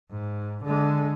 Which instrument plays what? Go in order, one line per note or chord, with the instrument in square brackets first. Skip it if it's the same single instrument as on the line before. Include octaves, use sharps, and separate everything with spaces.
[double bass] G#2
D3 G#3